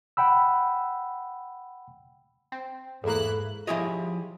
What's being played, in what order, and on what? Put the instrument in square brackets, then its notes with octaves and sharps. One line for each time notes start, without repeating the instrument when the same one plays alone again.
[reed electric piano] F#5 G5 B5 E6
[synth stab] C4
[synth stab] E2 A#3 [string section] G#2 E4 F#6 [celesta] G#4 A4
[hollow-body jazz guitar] F3 E4 G4 G#4 C#5 D#5